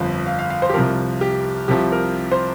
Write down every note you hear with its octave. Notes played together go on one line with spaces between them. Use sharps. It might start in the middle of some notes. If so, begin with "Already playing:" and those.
Already playing: G1 F2 F3 F5
F5
F5
F5
C5
G4
C2 C3 F3 A#4
G4
C2 C3 F3 G4
A#4
C5